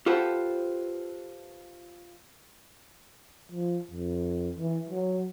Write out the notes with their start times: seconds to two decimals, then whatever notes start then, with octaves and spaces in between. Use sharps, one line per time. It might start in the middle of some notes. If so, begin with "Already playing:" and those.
0.06 F4 G4 A4 B4 C5 F#5
3.52 F3
3.91 F2
4.57 E3
4.89 F#3